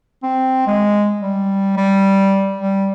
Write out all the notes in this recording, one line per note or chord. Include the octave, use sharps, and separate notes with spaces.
C4
G#3
G3
G3
G3